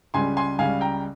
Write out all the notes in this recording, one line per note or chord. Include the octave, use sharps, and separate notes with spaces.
C#2 C#3 G3 G#5 C6
G#5 C6
C#2 C#3 G3 F5 G#5
G5 A#5